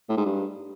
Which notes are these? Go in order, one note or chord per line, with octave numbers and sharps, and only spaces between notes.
A2
G#2
G2